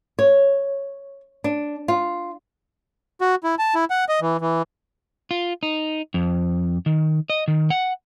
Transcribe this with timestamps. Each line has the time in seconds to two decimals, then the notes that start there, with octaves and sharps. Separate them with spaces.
0.19 C#5
1.44 D4
1.88 F4
3.21 F#4
3.44 E4
3.59 A5
3.75 E4
3.90 F#5
4.09 D#5
4.21 E3
4.41 E3
5.31 F4
5.63 D#4
6.14 F2
6.86 D#3
7.30 D#5
7.48 D#3
7.70 F#5